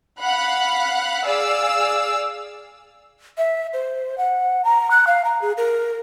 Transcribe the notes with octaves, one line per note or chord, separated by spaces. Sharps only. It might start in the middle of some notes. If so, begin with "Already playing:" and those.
F5 F#5 B5 F#6
G#4 D5 F5 E6
E5
C5
F#5
A#5
F#6
F5
A#5
G#4
A#4